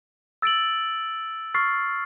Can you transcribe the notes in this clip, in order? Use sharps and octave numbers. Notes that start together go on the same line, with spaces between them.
E6 A6 D7 F#7
C#6 F6 A6 C7